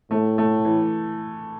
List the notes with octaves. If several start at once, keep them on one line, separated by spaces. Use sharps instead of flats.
A2 A3
A3
E3